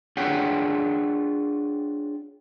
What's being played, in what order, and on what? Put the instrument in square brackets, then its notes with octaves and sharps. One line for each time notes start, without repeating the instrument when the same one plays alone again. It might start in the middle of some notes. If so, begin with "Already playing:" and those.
[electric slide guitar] D4 F4 G#4 C#5 F#5 G5